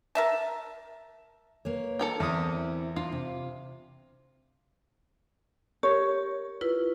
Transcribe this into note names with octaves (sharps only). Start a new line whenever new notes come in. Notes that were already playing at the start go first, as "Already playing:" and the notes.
A#4 E5 A5
A#3 B4 C#5
A4 A#4 G5
E2 C4 E4 D#6
D4 F4
C3
G4 A#4 C#5
E4 F4 B4